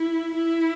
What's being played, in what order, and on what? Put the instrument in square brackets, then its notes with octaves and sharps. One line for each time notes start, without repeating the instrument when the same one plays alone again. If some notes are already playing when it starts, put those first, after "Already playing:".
Already playing: [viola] E4
E4